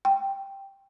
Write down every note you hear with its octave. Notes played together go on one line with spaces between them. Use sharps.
G5